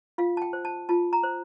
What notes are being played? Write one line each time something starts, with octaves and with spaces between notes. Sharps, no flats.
F4 F5
A5
G5
C5
A5
F4 A5
A#5
C5